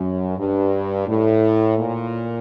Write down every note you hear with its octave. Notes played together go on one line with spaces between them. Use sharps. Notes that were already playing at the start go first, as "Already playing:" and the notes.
Already playing: F#2
G2
A2
A#2